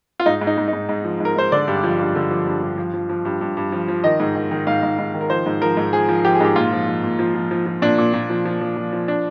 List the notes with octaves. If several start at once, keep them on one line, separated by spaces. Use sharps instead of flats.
F4
G#2 D#4
G#2
D#4
G#2
D#4
G#2
G#2
F3
G#2 A#4
G#2 C5
D3 D5
G2
F3
G2
D3
F3
G2
G2
F3
F3
F3
G2
G2
G2
F3
F3
D#3 D#5
G#2
D#3
D#3
G#2 F5
G#2
G#2
D#3
A#4
F3 C5
G#2
F3 A#4
G#2
F3 G#4
F3
F3 G4
G#4
G#2 G4
A#2 F4
F3
F3
A#2
F3
F3
F3
F3
A#2 D4
A#2
A#2
F3
F3
F3
F3
F3
D4